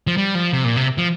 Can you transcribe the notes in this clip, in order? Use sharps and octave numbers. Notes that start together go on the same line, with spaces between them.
F3
G3
F3
C3
A#2
C3
F3